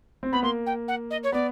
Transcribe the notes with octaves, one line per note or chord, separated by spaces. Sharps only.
C4
B3 B5
A#3 C6
G5
F#5
D#5
C#5
B3 D5